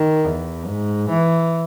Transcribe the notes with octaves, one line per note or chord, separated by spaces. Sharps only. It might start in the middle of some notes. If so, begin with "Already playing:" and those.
Already playing: D#3
E2
G#2
E3